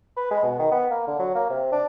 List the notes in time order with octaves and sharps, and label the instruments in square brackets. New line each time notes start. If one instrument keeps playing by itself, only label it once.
[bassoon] B4
G#3
B2
D#3
B3
A#3
D3
F#3
A#3
C3
D4